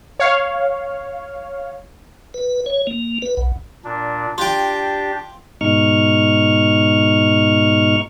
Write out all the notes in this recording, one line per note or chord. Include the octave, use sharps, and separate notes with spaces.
C#5 F5
B4
C#5
A#3
B4
B1
A#2 D4
D4 F4 G4 G5
G#2 B2 D#4 C#6 F6